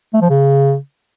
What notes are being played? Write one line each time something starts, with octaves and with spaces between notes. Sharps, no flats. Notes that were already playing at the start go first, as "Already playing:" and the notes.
A3
F3
C#3